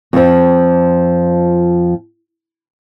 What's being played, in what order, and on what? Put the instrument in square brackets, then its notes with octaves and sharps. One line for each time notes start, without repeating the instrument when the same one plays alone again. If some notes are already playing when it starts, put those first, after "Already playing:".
[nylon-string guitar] F2 F3